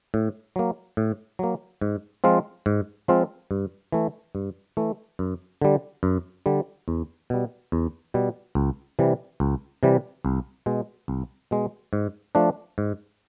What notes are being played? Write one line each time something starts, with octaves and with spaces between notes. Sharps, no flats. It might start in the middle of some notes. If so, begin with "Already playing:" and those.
A2
F#3 A#3
A2
F#3 A#3
G#2
F3 G#3 C4 F4
G#2
F3 G#3 C4 F4
G2
E3 A3
G2
E3 A3
F#2
D3 G3
F#2
D3 G3
E2
B2 G3
E2
B2 G3
C#2
C3 E3 G3
C#2
C3 E3 G3
C2
B2 G#3
C2
B2 G#3
G#2
F3 A3 D4
G#2